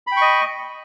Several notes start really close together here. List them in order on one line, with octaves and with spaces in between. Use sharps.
B5 G5 C#6 D#5